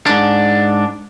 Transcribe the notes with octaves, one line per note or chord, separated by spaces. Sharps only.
G#2 D4